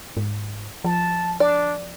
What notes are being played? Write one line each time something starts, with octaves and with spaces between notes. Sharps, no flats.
G#2
F3 A5
D4 D5